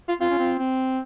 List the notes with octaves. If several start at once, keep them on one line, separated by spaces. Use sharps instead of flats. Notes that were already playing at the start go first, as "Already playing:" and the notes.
F4
C4 F4
C#4
C4
C4